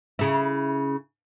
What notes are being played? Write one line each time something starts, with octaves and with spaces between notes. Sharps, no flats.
C#3 E4